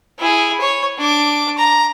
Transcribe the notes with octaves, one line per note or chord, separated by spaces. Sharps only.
E4 G#4
C#5
D4 D6
A#5